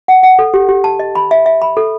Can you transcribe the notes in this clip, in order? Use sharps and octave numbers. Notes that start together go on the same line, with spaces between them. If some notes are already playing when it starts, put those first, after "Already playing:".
F#5
F#5
A4
G4
G4
A5
D#5
B5
E5
E5
B5
A4